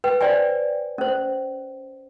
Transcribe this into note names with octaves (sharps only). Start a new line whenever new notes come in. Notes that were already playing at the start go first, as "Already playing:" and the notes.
B4 G5
C5 D5 G5 G#5
C#4 C5